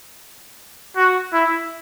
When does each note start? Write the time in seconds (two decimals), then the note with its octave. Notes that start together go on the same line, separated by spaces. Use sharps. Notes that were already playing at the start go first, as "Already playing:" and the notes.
0.97 F#4
1.33 E4